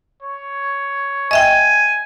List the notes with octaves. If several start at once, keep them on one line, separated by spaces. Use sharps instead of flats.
C#5
D#5 E5 G5 G#5